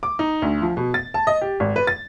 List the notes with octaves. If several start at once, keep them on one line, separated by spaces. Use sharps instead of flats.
D6
D#4
D2
F3
B2
A6
A5
D#5
G4
G#1
B4
A6